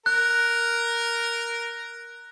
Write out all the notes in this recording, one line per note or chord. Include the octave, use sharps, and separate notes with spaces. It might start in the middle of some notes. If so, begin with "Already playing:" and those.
A#4 F#6